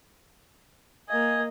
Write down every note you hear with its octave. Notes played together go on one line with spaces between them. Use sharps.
A#3 D#5 F5 G#5 G#6